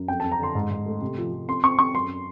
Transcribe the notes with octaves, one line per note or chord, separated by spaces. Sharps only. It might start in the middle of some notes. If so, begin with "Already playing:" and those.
Already playing: F#2
F2 G5
A5
F2
A#5
D3 C6
G#2
G#2
A3
C3
F3
F3
C4 C6
C4 C#6
C4 C#6
F#2 C6